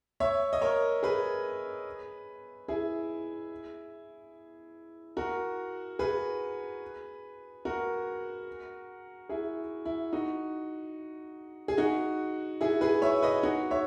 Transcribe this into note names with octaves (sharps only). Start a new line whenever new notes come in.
C#5 E5
D#5
A#4 C#5
G#4 B4
E4 G#4
F#4 A#4
G#4 B4
F#4 A#4
E4 G#4
E4
D#4 F#4
G#4
D#4 F#4
E4 G#4
G#4 B4
C#5 E5
B4 D#5
D#4 F#4
C#5 E5